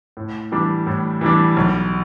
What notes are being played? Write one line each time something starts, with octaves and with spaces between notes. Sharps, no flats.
A2
E3 G3 D4
A2
E3 G3 D4
B1